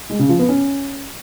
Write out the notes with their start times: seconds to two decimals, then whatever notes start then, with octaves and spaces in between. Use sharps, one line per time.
0.09 G#3
0.19 C#3
0.29 F3
0.39 B3
0.49 C#4